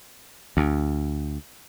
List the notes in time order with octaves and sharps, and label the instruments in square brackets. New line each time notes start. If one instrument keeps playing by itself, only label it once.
[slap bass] D2